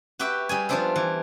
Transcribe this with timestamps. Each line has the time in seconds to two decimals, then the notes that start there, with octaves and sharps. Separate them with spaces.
0.19 F#4 G4 B4 E5 G5
0.49 G3 G#4 G#5
0.69 F3 G3 B3 D4 C5 E5
0.96 E3